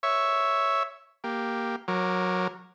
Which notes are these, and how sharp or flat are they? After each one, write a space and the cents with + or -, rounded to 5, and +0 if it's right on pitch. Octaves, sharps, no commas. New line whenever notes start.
C#5 +0 E5 +0 C#6 +0
A#3 +0 G4 +0
F#3 -15 A#4 +0 D6 +0